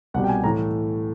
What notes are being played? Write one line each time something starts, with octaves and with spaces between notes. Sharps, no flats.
C2 B2 G3 F#5
G5
G#5
A2 E3 A3 A#5